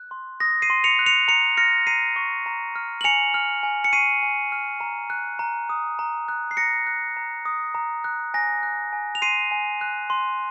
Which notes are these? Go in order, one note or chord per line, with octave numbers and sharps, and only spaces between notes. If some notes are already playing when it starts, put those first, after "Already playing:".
Already playing: F#6
C6
D#6 A#6
C7 D#7
C6
C#7 F7
F#6
C#7 F7
A#5 C#7 F7
F6 A#6 C#7
A#5 C7 D#7
C#6
A#5
F6
F#7
G#5 C#7 F7
F6
G#5
C#7
C#6 C7 D#7
G#5
F6
A#5
F#6
A#5
D#6
A#5
F#6
C7
A#5 A#6 C#7
F#6
A#5
D#6
A#5
F#6
G#5 A#6
F#6
G#5
F7
C6 C7 D#7
G#5
F#6
C6